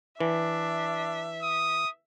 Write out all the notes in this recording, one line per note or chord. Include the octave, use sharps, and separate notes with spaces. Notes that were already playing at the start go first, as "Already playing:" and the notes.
E3 D4 E5
D#6